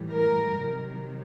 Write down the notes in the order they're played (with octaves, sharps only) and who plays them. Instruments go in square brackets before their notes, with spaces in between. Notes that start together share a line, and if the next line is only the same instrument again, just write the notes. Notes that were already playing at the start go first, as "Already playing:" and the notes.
Already playing: [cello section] A2 E3 G3
A#4
C3 D#3 F#3